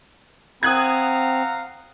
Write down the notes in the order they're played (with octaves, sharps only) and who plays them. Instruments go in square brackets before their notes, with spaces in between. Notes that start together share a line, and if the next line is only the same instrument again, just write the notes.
[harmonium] C4 [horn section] F5 F#5 A#5 [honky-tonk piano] D#6 F#6 G#6